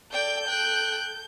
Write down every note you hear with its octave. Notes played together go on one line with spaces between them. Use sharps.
A4 D5 G5 G6
G5 F#6